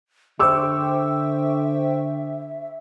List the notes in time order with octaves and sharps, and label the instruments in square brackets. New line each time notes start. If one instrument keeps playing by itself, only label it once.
[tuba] D3 [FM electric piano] C5 G5 C#6 [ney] E5 [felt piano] D6 E6